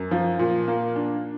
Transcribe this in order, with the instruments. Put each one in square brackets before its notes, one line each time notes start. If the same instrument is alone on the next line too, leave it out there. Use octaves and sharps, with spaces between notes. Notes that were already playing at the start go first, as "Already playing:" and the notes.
Already playing: [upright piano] F#2
F3
A#2
A#3
D4